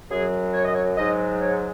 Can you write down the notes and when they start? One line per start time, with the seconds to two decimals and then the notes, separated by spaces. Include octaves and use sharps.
0.10 F#2 F#3 G#4
0.54 C#5
0.64 D#5
0.75 C#5
0.97 G#2 F#3 D#5
1.41 C#5